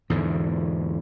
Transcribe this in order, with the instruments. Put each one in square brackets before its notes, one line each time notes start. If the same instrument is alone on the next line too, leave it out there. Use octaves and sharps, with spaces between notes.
[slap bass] E2 G#2 D3